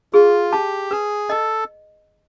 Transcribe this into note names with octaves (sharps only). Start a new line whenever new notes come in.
F4 G#4
G4 A5
G#4 B4
A4 D#5